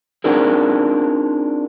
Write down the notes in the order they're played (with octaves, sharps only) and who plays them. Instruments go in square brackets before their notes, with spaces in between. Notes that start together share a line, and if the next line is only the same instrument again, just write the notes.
[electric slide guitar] C4 D4 D#4 F4 G#4 A#4